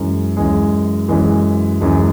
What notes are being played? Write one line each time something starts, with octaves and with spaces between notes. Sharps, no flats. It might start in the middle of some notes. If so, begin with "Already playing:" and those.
Already playing: F#2 E3 G#3
F#2 E3 G#3
F#2 E3 G#3
F#2 E3 G#3